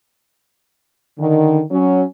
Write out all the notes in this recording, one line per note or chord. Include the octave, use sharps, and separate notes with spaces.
D3 D#3
F#3 C#4